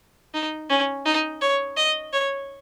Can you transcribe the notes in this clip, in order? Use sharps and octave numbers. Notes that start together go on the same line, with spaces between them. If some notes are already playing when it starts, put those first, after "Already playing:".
D#4
C#4
D#4
C#5
D#5
C#5